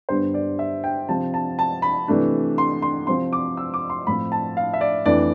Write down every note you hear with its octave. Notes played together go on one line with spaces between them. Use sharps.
G2 D3 G3 B3 D4 C5
D5
E5
G5
C3 F3 C4 A5
A5
A5
B5
C3 E3 A3 D4
C6
C6
C3 F3 C4 C6
D6
E6
D6
C6
A2 F3 C4 B5
A5
F5
E5
D5
F2 E3 A3 D4 D5